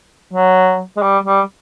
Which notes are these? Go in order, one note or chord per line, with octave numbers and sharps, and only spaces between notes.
F#3
G#3
G3
G3